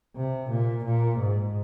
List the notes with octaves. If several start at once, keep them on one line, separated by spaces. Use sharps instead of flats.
C3
A#2
A#2
G#2